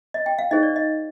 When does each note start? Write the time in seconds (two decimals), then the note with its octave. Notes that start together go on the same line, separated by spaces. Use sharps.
0.14 D#5
0.26 G5
0.39 F5
0.51 D#4 G#4 C5 D#5
0.63 D5
0.76 D#5